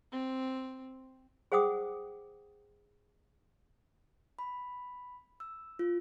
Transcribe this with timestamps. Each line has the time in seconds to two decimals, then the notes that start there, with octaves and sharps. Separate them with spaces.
0.12 C4
1.52 G#4 C5 F#5 G5 D6 D#6
4.39 B5
5.40 E6
5.79 F4